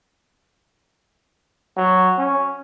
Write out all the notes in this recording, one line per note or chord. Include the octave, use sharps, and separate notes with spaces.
F#3
C#4